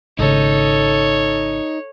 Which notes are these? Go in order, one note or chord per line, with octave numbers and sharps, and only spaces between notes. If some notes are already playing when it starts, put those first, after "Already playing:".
G#1 C#3 D#4 A4 C#5